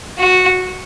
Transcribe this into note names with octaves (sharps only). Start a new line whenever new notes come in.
F#4